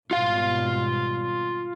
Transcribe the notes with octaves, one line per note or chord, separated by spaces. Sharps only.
G#1 B2 G3 F4 F5